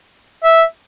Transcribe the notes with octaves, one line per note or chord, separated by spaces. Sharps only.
E5